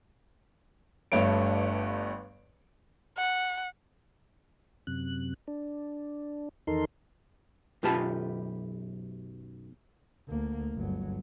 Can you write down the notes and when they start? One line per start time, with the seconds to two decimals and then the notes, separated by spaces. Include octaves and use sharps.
1.12 G1 G2 A3 C#5 D7
3.17 F#5
4.87 F#2 C3 F#6
5.48 D4
6.67 E2 D#3 D#4 A4 A#4 C6
7.83 B1 F#2 F4 G4 B4 A5
10.28 D2 A#3
10.74 G1 F#3